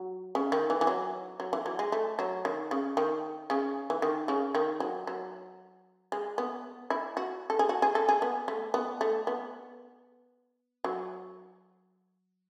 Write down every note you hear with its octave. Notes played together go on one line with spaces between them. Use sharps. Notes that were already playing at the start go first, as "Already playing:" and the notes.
Already playing: F#3
C#3
D#3
E3
E3
F#3
F#3
E3
F#3
G#3
A3
F#3
D#3
C#3
D#3
C#3
E3
D#3
C#3
D#3
F#3
F#3
G#3
B3
E4
F#4
A4
G#4
F#4
G#4
A4
G#4
B3
A3
B3
A3
B3
F#3